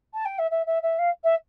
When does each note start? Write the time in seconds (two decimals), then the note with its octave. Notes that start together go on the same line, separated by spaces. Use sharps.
0.14 A5
0.25 G5
0.39 E5
0.51 E5
0.67 E5
0.83 E5
0.99 F5
1.24 E5